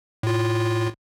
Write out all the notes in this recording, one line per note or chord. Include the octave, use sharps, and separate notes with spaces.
A2 F4